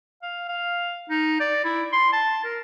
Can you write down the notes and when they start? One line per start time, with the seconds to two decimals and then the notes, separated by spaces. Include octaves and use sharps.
0.22 F5
0.49 F5
1.10 D#4
1.40 D5
1.64 E4
1.92 C6
2.13 A5
2.44 A#4